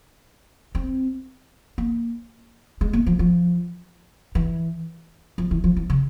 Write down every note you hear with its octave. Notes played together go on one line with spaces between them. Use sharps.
C4
A#3
G#3
A#3
F3
F3
E3
F3
E3
F3
E3
C#3